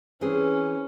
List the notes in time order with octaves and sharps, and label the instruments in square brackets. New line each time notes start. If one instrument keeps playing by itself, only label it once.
[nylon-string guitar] E3 C4 G#4 [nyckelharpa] C#4